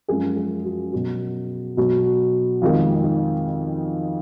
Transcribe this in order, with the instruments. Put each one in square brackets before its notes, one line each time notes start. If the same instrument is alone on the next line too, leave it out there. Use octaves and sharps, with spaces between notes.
[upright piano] F#2 F3 G#3 G#4
G#4
F#4
B2 F#3
B2 F#3
F2 D#3 G#3 F4
D#4